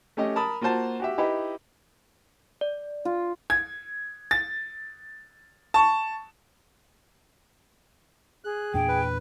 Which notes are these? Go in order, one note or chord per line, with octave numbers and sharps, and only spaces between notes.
A3 C#4 G4 D#5
A#4 A5 B5 D#6
A#3 F4 F#4 C5 A5
F#4 G4 E5
D#4 E4 G4 B4 D#5
D5
F4
G#6
A6
A5 C#6
G#4 F#6
E2 A#2 D4 G5
B4